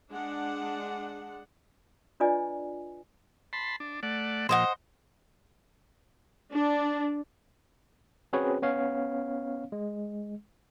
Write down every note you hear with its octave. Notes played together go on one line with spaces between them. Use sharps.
G#3 D4 F#5
D4 F4 B4 D5 D#5 G#5
A5 B5 C6
D4
A3 D5 F#5
A#2 F3 C5 D#5 F#5
D4
C4 C#4 F#4 G#4 B4 C#5
B3 C#4 C#5 F5
G#3